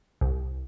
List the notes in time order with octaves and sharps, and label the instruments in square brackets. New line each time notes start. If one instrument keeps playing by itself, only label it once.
[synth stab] C2